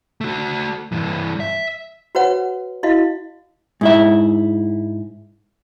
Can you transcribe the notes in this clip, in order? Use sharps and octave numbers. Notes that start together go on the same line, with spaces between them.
A3 F#4
G2 E3
E5
F#4 B4 C#5 F#5
E4 F#4 D#5 F5
G#2 E4 E5